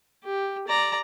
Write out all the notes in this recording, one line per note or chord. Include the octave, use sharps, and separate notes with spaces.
G4
D5 A#5